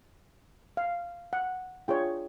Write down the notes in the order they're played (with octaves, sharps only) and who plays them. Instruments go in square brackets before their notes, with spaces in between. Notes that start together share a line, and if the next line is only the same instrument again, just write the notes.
[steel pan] F5
F#5
D4 F4 G#4 C#5 G5